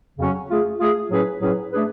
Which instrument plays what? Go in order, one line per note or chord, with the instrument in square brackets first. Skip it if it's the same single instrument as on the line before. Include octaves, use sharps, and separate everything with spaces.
[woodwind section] F2 C#3 F#3 C#4 F#4
A3 F4 G#4
A3 F4 G#4
A2 F#3 C#4 G#4 B4
A2 F#3 C#4 G#4 B4
A3 D4 G#4 B4